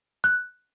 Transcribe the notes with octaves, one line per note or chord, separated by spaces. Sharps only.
F#6